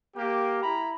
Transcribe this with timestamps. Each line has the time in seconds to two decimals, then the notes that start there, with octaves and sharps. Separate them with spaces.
0.16 A#3 G4
0.63 E4 A#5 B5